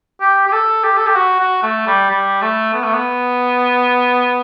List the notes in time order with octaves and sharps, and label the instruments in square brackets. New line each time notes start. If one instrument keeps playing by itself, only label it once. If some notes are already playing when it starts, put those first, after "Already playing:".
[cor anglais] G4
G4
A4
G4
A4
G4
F#4
F#4
A3
G3
G3
A3
B3
A3
B3